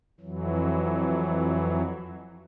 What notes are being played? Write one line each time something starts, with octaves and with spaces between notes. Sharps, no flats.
F2 E3 F#3